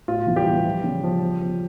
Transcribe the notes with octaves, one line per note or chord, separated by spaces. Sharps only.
A2 F4
E3
G3 G4
E3
F3
C#3
F3
F3
F3